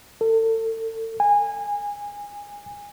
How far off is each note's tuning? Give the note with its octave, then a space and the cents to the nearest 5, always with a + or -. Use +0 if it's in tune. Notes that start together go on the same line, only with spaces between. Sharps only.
A4 +35
G#5 -20